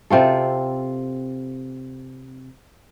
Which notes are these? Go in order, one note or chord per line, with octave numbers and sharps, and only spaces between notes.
C3 C4 F4 A4